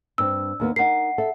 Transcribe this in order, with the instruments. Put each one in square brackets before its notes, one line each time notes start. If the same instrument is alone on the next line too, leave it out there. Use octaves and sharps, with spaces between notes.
[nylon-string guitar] G2 C4 [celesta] E6
[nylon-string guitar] D#2 A#3 B3
[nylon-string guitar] D#4 A#4 [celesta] F#5 C7
[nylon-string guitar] A4 E5